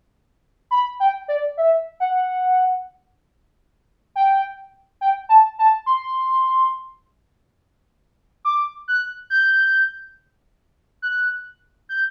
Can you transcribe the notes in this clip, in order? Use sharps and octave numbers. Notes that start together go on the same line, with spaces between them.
B5
G5
D5
E5
F#5
G5
G5
A5
A5
C6
D6
F#6
G6
F#6
G6